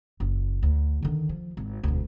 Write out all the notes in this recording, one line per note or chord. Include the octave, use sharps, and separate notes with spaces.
F#1
D2
D3 D#3
F3
G#1
E1 D2